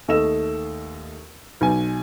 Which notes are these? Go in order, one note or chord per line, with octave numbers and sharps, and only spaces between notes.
D#2 A3 D#5 E6 E7
B1 G#5